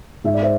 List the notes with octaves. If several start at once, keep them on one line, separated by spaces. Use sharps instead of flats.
G#2 E5
D5
C5 E5